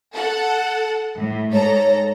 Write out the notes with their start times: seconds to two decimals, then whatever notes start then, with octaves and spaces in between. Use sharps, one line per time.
0.13 A4 F#5
1.19 A2
1.53 G#2 A4 C#5 A#5